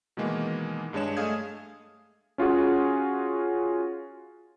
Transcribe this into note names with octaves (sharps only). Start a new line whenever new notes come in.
B2 D#3 E3 G#3 A#3
G2 G#3 D4 C#5 E7
A3 G#4 D#5 F5 D#6 G#6
C#4 F4 F#4 G#4